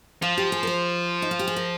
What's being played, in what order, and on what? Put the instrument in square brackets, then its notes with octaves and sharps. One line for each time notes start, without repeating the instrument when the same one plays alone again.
[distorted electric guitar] F3 [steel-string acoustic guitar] F4
[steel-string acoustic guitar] G4
G#4
A#4
C5
D#4
F4
G4
G#4
A#4